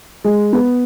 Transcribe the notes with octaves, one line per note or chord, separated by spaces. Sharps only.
G#3
B3